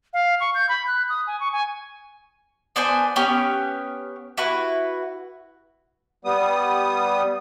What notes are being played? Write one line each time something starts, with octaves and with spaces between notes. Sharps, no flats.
F5
C#6
G6
B5
F#6
D#6
G#5
C#6
G#5
B3 D4 C5 G#5
B3 C#4 G4 C#5
E4 F#4 B4
G3 B3 D#6